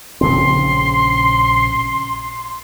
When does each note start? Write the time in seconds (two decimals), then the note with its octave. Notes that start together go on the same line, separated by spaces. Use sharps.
0.21 A#1 C#3 C4 C6